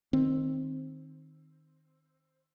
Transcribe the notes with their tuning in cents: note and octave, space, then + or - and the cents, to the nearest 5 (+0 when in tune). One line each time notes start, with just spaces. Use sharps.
D#3 -5 C4 +10